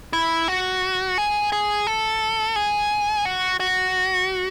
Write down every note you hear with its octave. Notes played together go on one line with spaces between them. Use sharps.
E4
F#4
G#4
G#4
A4
G#4
F#4
F#4